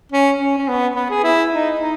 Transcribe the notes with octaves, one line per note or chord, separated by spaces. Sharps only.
C#4
C#4
C#4
B3
B3
G#4
E4
D#4
D#4